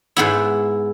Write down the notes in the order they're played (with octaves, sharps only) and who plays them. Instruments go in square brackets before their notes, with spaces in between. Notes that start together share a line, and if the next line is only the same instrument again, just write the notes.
[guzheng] G#2 B3 E4